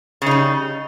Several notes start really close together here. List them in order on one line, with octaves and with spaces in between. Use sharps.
C#3 D#4 G3